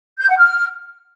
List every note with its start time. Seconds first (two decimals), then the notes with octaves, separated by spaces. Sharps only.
0.20 G6
0.29 F#5
0.37 F6